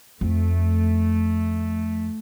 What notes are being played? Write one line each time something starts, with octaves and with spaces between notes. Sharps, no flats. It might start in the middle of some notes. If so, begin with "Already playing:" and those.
F2 A3